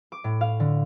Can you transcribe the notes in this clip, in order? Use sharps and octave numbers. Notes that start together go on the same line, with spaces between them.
D6
A2
F5
D3